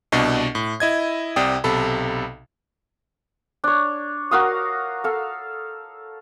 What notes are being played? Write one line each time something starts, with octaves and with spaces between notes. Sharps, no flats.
C2 B2 D4 D#5 C#6
A2
E4 D#5 G#6
C2 C3 D5 G5 D#6
B1 C3 A4 B5
D4 C#5
F#4 A#4 F5 D#6
A4 F5